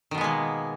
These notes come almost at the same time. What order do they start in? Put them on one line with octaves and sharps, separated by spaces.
D#3 B2 B3 G#3 A#3